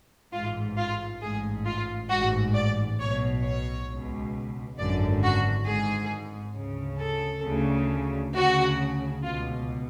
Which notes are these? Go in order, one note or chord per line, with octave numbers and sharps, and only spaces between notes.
A1 G#2 F4
F4
A1 G#2 G#4
F4
A1 G#2 F#4
D5
B1 B2 C#5
C#5
C#2 B2
G#1 F#2 D3 D5
F#4
G#1 G#2 G#4
D2 C#3
A4
D2 C#3
D2 C#3 F#4
C#2 B2 F4